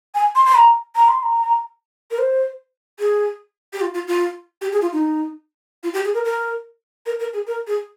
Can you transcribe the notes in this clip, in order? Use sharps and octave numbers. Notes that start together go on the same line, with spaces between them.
G#5
C6
C6
A#5
A#5
C6
A#5
A#4
C5
G#4
G4
F4
F4
F4
G4
G#4
F4
D#4
F4
G4
G#4
A#4
A#4
A#4
A#4
G#4
A#4
G#4